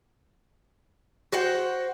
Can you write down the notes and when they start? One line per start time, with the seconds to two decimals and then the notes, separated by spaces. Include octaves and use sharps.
1.32 F#4 C5 F#5 G5